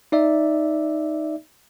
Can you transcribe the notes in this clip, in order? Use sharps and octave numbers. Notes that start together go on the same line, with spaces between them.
D#4 D5 E5